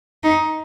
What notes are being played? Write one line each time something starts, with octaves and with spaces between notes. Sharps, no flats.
D#4